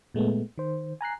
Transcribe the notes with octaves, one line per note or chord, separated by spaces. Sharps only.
A#2 G#3 A3 B3
D#3 C5
G#5 A#5 F#6 C7